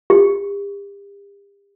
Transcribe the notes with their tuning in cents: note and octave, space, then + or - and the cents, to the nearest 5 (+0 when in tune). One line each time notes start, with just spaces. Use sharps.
G4 +40